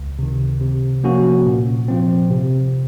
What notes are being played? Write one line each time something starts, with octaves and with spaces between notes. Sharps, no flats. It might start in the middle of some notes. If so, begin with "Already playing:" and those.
Already playing: C#2
C3 D#3
C3
F3 A#3 C#4 F#4
A#2
F3 C4
C3